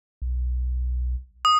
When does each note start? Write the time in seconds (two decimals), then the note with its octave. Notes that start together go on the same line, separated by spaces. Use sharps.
0.22 B1
1.45 D#6